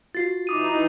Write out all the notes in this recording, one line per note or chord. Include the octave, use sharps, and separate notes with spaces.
F4 F#4 A6 C7
E3 D#4 D6 D#6 D#7